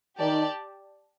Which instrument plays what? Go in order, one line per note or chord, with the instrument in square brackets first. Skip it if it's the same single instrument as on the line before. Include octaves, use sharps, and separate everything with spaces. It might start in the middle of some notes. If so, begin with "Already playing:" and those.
[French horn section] D#3 [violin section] G4 D5 A5